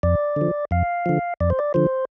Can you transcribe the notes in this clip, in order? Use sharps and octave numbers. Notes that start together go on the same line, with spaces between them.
F2 D5
D3 F3
F2 F5
D3 F3
F2 D5
C5
D5
D3 F3 C5